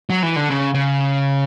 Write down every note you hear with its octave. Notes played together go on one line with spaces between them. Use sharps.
F#3
E3
D3
C#3
C#3